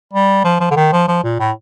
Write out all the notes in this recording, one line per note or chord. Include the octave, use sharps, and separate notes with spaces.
G3
F3
F3
D3
D#3
F3
F3
A#2
A2